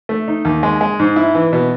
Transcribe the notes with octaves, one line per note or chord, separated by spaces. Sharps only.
A3
D#4
D#2
G#3
G#3
G#2
E4
E3
B2